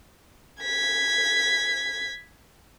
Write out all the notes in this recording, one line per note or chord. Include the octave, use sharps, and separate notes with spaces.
G#6 B6